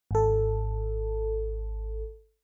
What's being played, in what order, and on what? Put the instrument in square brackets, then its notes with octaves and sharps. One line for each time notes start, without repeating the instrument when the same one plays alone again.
[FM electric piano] G#1 A4